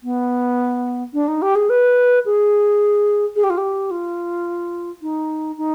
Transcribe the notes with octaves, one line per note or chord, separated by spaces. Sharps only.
B3
D4
D#4
G4
G#4
B4
G#4
G#4
G4
F4
G4
F4
D#4
D#4